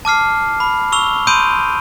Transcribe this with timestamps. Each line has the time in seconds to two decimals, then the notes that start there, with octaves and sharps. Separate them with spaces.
0.05 A5 D6 F6 C7
0.60 B5
0.92 C#6 E6 F7 G7
1.27 B5 C6 D#6 G6 D7 D#7